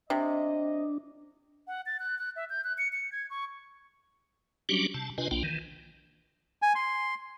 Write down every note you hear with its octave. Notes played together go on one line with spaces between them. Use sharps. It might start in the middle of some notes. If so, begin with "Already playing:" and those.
C3 D4 D#5
F#5
A6
F#6
F#6
E5
G6
F#6
C#7
C#7
G#6
C#6
F#3 G3 C#4 D4 F#4 G4
C3 A5
C3 D4 F4 B4 D#5 G#5
B1 A#3 D4 F4 G5
D#3 E3
G#5
C6